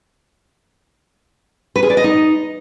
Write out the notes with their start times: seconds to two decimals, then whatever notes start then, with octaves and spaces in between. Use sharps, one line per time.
1.76 B4
1.83 G#4
1.90 D5
1.97 D#5
2.04 D#4